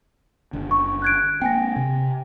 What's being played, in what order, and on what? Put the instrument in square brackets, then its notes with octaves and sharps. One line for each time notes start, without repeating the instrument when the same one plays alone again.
[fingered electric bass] F#1 D3
[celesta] C#6
F#6 G#6 D7
[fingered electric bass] A#3 C4 [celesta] G5 G#5 A#6
[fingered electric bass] C3